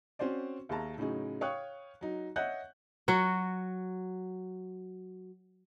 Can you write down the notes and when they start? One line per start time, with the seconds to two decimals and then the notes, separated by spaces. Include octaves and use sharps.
0.19 C4 C#4 F#4 C5 D5
0.69 D#2 G#4 E5 A5 A#5
0.98 A2 C#3 F#3 D#4 G#4
1.41 C#5 F5 G5 C#6 D#6 F#6
2.01 F#3 D#4
2.36 C#5 D#5 E5 F#5 F#6 G6
3.08 F#3 F#4